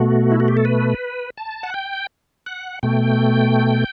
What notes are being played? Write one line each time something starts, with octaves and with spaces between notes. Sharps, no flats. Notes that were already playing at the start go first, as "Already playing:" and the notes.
Already playing: B2 A3 F#4
E4
F#4
G4
A4
B4
A5
F#5
G5
F#5
B2 A3 G5